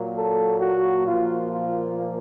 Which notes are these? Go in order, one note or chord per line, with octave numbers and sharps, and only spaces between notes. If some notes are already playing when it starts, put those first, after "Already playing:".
Already playing: A#2 F#3 A#3
A4
F#4
A#2 F3 A#3 F4
F4